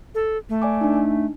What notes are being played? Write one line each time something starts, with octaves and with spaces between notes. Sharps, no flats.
A4
A3
D5 G#5 D6
D4 D#4